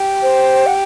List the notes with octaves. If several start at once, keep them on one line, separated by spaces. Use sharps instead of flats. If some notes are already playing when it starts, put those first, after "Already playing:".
Already playing: G4
C5
F#5